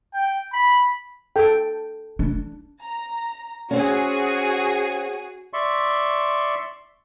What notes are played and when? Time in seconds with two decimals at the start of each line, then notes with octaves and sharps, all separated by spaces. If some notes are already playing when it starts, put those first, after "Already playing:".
0.14 G5
0.52 B5
1.36 A4 G5
2.19 D4
2.81 A#5
3.71 C4 C#4 F#4 G#4
5.53 D5 E5 C6 C#6